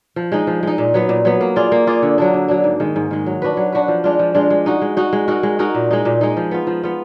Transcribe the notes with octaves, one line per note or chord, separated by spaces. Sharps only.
F3
G#3 D#4
F3
G#3 D#4
A#2
F#3 B3
A#2
F#3 B3
A#3
F4 G#4 D5
A#3
F4 G#4 D5
D3
F#3 A#3 D4
D3
F#3 A#3 D4
G#2
D#3 G#3
G#2
D#3 G#3
F#3
D4 F#4 B4
F#3
D4 F#4 B4
F3
G#3 D4 F4
F3
G#3 D4 F4
G#3
D#4 F#4
G#3
D#4 F#4
G#3
D#4 F#4 A#4
G#3
D#4 F#4 A#4
A#2
G#3 D#4
A#2
G#3 D#4
F3
B3 F4
F3
B3 F4